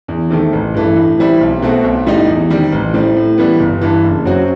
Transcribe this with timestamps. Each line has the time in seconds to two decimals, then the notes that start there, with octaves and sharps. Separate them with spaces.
0.08 E2
0.30 C3 D#3 A3
0.53 A1
0.74 G2 E3 A3
0.96 A2
1.18 E3 G3 C4 E4
1.41 B1
1.62 B2 A3 C4 F#4
1.84 B1
2.06 A2 G3 D#4
2.28 E2
2.50 C3 D#3 G3
2.72 A1
2.94 A2 G3 C4
3.16 A2
3.38 E3 G3 B3
3.60 G1
3.81 G2 E3
4.04 F#1
4.25 F#2 F#3 C4 F#4